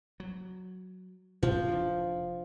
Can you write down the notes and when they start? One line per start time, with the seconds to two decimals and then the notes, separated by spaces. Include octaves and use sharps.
0.20 F#3
1.43 A#2 F3
1.68 F1 D4